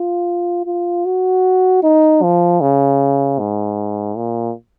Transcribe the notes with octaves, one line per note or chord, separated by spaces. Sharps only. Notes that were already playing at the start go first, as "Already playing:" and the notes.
Already playing: F4
F4
F#4
D#4
F3
C#3
G#2
A#2